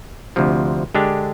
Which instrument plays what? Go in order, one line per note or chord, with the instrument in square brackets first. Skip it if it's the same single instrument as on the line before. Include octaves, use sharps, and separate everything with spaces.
[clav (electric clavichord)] D2 C3 F3
D3 G#3 D4 G4